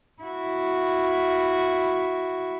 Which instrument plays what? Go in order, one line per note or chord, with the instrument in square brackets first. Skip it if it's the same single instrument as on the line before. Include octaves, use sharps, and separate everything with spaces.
[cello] E4 F#4